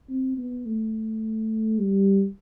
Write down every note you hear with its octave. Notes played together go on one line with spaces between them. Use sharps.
C4
B3
A3
G3